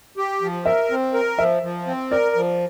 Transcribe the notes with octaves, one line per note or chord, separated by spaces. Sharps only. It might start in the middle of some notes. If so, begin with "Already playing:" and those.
G4
F3
A#4 E5
C4
A#4
F3 E5
F3
C4
A#4 D5
F3